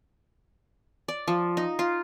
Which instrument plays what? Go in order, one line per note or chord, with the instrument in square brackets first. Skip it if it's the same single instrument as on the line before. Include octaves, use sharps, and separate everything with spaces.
[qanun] D5
F3
D#4
F4